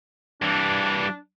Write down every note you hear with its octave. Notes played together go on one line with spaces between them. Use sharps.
G2 E3 D4